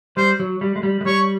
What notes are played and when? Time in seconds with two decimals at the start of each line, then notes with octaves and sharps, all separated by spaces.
0.17 G3 C5
0.40 F#3
0.61 G3
0.76 G#3
0.83 G3
1.01 G#3
1.05 G3 C#5